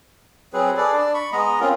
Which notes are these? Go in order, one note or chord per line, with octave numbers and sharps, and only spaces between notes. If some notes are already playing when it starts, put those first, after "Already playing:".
F#3 C4 G#4 B4
G#4 A4 B4 D5
D4 D5
B5 C#6
G#3 B3 D#5 A#5
C4 C#4 F4 A#4